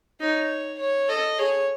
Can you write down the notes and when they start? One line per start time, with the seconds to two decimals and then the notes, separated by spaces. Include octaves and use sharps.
0.20 D#4 C#5
0.79 C#5
1.09 A4 D#5
1.38 G#4 C#5